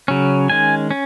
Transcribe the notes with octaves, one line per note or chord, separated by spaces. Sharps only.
C#3 F#3 C#4
D#3 G#3 C#4 G#5
C#4